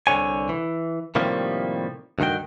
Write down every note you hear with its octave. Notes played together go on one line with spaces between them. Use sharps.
C2 G2 D3 C#5 G#5
E3
A2 C3 D#3 F3 G3 A#3
D2 G2 D#3 F#4 G5